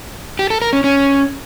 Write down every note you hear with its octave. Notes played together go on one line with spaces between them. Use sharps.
G4
A4
A#4
C#4
C#4